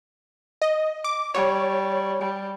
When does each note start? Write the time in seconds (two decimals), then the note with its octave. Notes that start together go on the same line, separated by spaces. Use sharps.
0.62 D#5
1.04 D6
1.34 G3 C#5
2.22 G3